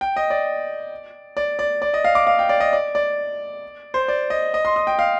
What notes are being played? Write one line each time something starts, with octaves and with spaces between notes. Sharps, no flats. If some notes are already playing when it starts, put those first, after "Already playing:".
G5
D#5
D5
D5
D5
D5
D#5
F5
D6
F5
G5
D5
D#5
D5
D5
C5
D5
D#5
D#5
C6
D#6
G5
F5